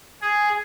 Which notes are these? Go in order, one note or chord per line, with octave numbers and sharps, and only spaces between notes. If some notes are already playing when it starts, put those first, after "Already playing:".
G#4